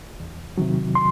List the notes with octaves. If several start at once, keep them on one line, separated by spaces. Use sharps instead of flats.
E2
C3 D#3 F#3
C6